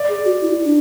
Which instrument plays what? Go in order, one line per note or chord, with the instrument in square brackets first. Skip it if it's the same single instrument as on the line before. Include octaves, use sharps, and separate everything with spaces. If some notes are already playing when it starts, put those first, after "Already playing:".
Already playing: [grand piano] D5
[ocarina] G#4
F#4
E4
D4